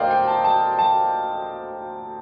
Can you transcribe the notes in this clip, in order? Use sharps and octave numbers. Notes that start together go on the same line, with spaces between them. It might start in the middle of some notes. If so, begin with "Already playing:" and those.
Already playing: D2 D3 A#4 C5 D5 D#5 F5 G5
G5
A5
A5
A5